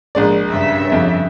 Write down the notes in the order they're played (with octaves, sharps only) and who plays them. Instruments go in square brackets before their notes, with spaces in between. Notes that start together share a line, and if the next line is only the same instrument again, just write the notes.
[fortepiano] A#1 G#3 D5
[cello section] G2 C#3 E5
[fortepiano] F2